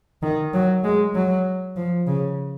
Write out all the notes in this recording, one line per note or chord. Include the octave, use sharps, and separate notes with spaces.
D#3
F#3
G#3
F#3
F3
C#3